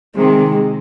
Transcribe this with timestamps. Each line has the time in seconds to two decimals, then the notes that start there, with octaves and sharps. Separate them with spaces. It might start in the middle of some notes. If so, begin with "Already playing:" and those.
0.16 C3 D#3 G#3